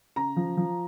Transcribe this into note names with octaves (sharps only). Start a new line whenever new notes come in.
C#3 A#5
F3
F3